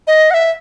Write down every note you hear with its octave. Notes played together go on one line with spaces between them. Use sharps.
D#5
F#5
E5